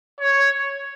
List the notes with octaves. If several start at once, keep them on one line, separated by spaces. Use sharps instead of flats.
C#5